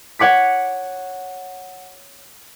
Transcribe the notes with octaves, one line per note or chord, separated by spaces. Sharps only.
C#5 F#5 D6 B6